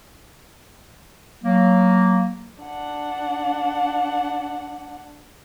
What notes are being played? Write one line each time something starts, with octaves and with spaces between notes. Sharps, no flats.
F#3 A#3
D4 F#5